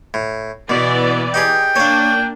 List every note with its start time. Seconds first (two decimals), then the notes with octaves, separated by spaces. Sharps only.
0.14 A2
0.70 B2 E3 B3 D5
1.34 D#4 G4 G#4 G5
1.76 A#3 D4 C#5 F5